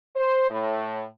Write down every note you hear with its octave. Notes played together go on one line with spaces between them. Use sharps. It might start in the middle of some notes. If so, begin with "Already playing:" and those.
C5
A2